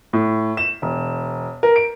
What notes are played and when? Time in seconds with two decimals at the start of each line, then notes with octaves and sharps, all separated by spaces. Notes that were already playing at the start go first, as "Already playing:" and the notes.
0.13 A2
0.57 E7
0.82 E1
1.63 A#4
1.76 D7